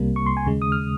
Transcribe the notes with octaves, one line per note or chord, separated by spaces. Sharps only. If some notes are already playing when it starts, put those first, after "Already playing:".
Already playing: C2 C3 G3 A#3
C#6
C6
G#5
D#2 C#3 G#3
D#6
F6